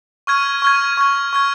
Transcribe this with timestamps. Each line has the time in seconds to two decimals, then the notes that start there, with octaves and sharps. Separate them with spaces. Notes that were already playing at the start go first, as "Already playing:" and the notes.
0.27 C#6 F6 G#6 D#7
0.62 C#6 F6 G#6
0.97 C#6 F6 G#6
1.33 C#6 F6 G#6